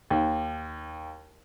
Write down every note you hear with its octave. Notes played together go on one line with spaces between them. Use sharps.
D#2